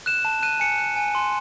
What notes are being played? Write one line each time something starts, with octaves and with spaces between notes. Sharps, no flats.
F#6 E7
A5
F#6 D#7
G#5 C#7
F#6
G#5
C6